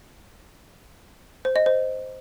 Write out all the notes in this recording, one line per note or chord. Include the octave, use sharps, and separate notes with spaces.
C5
D#5
C5